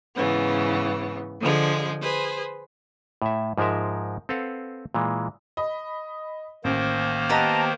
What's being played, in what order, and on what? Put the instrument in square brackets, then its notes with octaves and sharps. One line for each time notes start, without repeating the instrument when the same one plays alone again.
[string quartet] G#2 C#3 E3 B3
D3 F3 G#3
G#4 B4 C5
[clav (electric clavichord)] A2 E5
G#2 F3 G#3 A#4 E5
C4 A4 B4 F5 F#5
A#2 E3 G#3
[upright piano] D#5 B5
[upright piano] A1 [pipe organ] D#3 A#3 C5
[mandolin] B3 G4 D#5 [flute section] A5 A#5